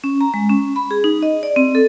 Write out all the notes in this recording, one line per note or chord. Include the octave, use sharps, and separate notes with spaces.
C#4
A#5
G#3
C#4
B5
G#4
D#4
D#5
D5
C4
A4